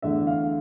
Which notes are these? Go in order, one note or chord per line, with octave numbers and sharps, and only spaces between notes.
E2 D3 A3 D4 E5
F5